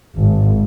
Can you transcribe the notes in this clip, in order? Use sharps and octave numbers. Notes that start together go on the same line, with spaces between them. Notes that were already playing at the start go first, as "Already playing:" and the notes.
G#1